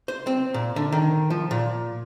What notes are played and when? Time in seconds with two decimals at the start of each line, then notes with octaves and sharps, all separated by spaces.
0.08 C5
0.27 C4
0.54 A#2
0.76 D3
0.92 D#3
1.30 F3
1.51 A#2